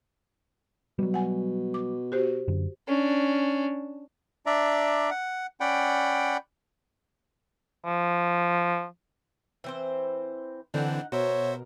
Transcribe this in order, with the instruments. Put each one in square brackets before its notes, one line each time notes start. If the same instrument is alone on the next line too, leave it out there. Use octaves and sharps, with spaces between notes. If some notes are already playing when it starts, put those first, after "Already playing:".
[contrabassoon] B2 [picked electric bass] F#3 G3
[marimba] F#5 G#5
D6
F#4 G4 C5
[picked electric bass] F#2 D3
[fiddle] C#4 D4
[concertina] D4 D5 E5 A#5
F#5
C#4 D5 F#5 G5 B5
[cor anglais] F3
[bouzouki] E3 C4 C5
[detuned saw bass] D3 [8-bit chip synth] E3 C4 D4 [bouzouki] D#4 F#5
[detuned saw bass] B2 [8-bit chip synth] F#4 C5 E5 [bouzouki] A#4 [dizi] C#5